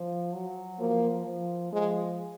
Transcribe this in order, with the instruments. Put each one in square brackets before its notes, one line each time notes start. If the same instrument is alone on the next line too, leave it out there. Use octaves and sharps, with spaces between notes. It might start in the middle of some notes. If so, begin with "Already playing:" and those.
Already playing: [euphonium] F3
F#3
[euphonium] F3 [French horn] A#3
[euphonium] F3
[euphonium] F3 [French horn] G#3